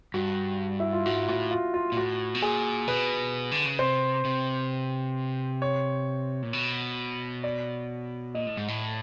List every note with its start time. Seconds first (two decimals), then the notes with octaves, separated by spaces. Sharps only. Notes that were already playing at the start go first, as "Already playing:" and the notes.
0.14 G2 F#4
0.80 E4
0.93 F4
1.06 G#2 F#4
1.28 A2 F#4
1.51 F4
1.74 F4
1.92 A#2
1.97 A2 F#4
2.35 B2
2.42 A#2 G#4
2.87 B2 B4
3.51 D3
3.65 C#3
3.79 C3 C5
4.25 C3
5.62 C#5
6.42 A#2
6.53 B2
7.44 D5
8.35 A#2 D#5
8.46 A2
8.57 G#2
8.68 A2